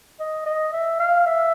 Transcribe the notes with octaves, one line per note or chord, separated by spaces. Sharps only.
D#5
D#5
E5
F5
E5